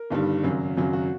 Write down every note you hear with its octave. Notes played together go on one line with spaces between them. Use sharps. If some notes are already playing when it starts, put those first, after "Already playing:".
Already playing: A#4
G1 G2 D#3 G3
G#1 F#2 C#3 F#3
G#1 F#2 C#3 F#3
F#4